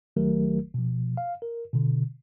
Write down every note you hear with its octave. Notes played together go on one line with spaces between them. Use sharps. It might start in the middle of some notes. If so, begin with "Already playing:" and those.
G#1 D#3 F#3 A3 G4 A#4
B2 F3
F5
A#4
B2 D3